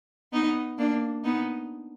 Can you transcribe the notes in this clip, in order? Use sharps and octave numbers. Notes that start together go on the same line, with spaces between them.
B3 D#4
A#3 D4
B3 D#4